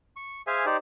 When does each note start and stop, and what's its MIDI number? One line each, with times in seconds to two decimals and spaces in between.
0.16 0.41 85
0.47 0.65 68
0.47 0.65 72
0.47 0.65 76
0.47 0.65 77
0.47 0.65 80
0.66 0.77 63
0.66 0.77 67
0.66 0.77 72
0.66 0.77 74